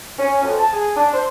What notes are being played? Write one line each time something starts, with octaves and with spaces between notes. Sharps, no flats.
C#4
F2
A5
G#4
D4
C5